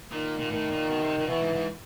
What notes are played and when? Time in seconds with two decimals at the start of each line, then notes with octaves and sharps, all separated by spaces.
0.12 A#2 D#3
0.39 A#2
0.50 A2 D#3
0.70 A#2
0.89 B2
1.02 C3
1.18 A#2
1.28 B2 E3
1.40 G#2
1.53 G#2